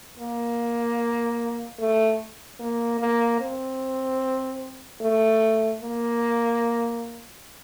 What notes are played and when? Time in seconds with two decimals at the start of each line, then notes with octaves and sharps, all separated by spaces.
0.20 A#3
1.80 A3
2.60 A#3
3.00 A#3
3.41 C4
5.01 A3
5.82 A#3